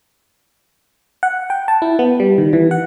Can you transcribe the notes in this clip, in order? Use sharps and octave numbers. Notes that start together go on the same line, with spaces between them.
F#5
G5
A5
E4
B3
G3
D#3
E3
F#5